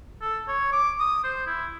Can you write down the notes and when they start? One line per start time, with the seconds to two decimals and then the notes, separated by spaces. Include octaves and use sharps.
0.22 A4
0.48 C#5
0.72 D6
1.00 D#6
1.24 C5
1.47 E4